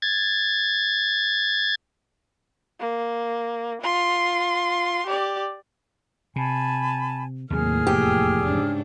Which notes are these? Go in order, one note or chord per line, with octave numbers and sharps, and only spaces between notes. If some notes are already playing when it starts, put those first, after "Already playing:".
G#6 A6
A#3
F4 C6
G4 D5
C3 G#5 A5 B5
D#2 A2 C3 F#3 A#3 G#4 F6
F1 E2 G4
G#2 C#3 D4